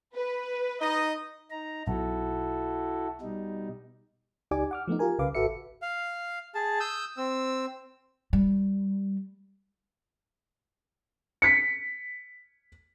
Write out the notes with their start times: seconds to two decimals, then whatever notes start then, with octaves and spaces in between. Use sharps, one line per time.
0.15 B4
0.80 D#4 D#5
1.51 D#4 A#5
1.87 B1 E4 F#4 A4
3.21 B2 G3 D#4
4.51 C#2 D#4 G4 D5 G#5 D6
4.71 F#5 D6 F6
4.88 F3 A3 B3 D#4
4.99 F4 G4 A#4 G#5
5.19 C2 C#3 B4 F5 D6
5.35 G#1 F#4 A4 B4 E5 C#7
5.82 F5
6.55 G#4 A5
6.80 D#6 E6 G6
7.17 C4 E6
8.33 G3
11.42 B6 C#7